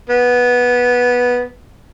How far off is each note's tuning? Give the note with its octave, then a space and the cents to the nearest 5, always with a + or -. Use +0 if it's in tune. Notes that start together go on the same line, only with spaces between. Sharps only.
B3 -10